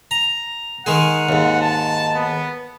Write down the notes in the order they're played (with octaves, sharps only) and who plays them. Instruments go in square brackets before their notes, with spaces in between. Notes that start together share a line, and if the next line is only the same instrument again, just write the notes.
[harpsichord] A#5
[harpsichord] D#3 G#3 G#4 [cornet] F#5
[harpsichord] D#2 G#2
[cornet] A5
B3